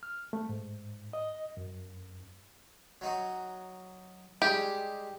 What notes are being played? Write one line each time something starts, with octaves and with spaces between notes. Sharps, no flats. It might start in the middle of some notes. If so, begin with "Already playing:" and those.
F6
A3
G#2
D#5
F#2
F#3 D#4 F#4
G3 G#3 D#4 G4